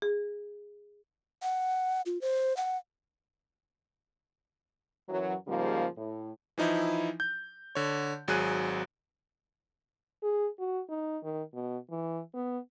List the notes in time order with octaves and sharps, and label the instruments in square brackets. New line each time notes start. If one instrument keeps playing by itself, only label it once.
[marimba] G#4
[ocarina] F#5
F4
C5
F#5
[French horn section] F#2 E3 F#3
G#2 C#3 F3 G3 A#3
A2
[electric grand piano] E3 F3 D#4 E4
G6
D3 C#5
G#1 F#3 G#4 F#6 D#7
[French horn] G#4
F#4
D#4
D#3
B2
E3
B3